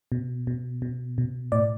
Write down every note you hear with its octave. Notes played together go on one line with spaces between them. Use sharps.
B2
B2
B2
B2
A2 D5